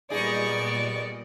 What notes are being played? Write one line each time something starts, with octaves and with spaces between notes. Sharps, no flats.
A#2 G3 B3 D#4 G#4 D5 D#5 C#6